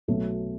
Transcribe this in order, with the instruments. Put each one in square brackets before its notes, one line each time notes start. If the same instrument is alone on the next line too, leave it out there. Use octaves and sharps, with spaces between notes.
[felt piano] B1 B2 F#3 A3